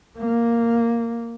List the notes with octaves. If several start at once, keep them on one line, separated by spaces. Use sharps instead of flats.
A#3